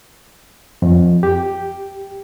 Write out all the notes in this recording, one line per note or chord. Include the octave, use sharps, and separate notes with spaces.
F2
G4